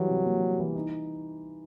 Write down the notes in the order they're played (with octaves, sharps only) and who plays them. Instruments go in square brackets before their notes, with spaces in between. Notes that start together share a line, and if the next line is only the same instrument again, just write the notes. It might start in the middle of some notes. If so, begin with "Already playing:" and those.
Already playing: [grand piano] E3 G3 [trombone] F#3
[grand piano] C3
A#3
G3
E3
D#4